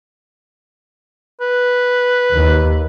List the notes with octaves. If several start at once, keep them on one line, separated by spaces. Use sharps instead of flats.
B4
D#2